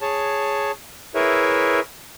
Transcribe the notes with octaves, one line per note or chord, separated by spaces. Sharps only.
G#4 C#5 A5
E4 G#4 A#4 B4 C#5 E5